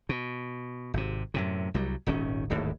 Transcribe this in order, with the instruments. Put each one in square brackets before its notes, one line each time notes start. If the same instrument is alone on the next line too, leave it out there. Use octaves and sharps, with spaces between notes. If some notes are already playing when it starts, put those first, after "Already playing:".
[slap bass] B2
G#1 C3
F#2 A2 C3
C2 F#3 G3
D#1 G#1 D#3 C#4
D1 G#1 D#2 A2